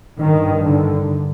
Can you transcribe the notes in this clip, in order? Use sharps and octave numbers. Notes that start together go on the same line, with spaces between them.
G2 D#3
D3